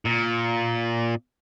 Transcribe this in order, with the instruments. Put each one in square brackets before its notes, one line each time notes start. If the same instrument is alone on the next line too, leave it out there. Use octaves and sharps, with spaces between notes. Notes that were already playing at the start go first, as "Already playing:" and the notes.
[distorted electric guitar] A#2